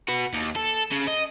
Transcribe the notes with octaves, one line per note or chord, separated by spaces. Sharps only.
F#4 B4
D#2
A4
C#3
D#5